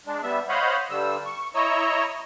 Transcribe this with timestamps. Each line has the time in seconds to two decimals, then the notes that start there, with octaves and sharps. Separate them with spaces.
0.06 G#3 D4
0.23 G3 B3 E5
0.49 C5 C#5 D#5 F5 F#5 B5
0.90 G2 D3 G3 E6
1.25 C#6
1.55 E4 C#5 D#5 A#5 C#6 E6